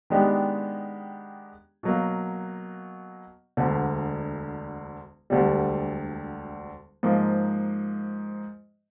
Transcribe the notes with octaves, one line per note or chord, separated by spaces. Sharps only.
D#3 G#3 B3 D4 G4
B2 F#3 A#3
E1 D2 D3
E1 D2 D3 G3
G#2 F3 A#3